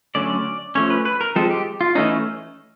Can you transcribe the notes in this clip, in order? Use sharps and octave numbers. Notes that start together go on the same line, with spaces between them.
D3 F#3 A3 C#4 D5
F3 A3 C#4 C#5
B4
B4
A#4
F3 G#3 C4 A4
G4
F4
E3 A3 C#4 D#4